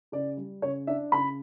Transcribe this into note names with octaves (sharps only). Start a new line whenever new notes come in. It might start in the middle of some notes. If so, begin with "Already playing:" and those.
C#3 D5
G3
C#3 C#5
D4 E5
C#3 B5